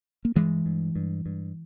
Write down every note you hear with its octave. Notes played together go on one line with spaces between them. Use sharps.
A#3
G2 E3 G#3
G2
G2
G2